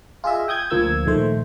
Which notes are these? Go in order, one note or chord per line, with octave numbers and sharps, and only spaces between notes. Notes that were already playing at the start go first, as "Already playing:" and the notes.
F4 G#4 D#5 E5
G5 D#6 G6 G#6
D2 F3 A#3 E6 G#6
A#1 D#3 A3 C5